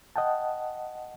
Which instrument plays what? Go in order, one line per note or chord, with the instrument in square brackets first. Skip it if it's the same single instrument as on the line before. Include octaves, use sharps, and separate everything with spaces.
[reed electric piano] D#5 F#5 G5 A5